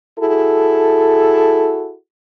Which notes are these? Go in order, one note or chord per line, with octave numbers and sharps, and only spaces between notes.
E4 F#4 G#4 A4